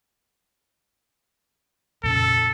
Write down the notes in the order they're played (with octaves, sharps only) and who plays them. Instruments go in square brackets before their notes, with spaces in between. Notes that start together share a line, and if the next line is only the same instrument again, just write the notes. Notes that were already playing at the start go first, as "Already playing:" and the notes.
[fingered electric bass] F2 A#2 C#3 [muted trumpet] A4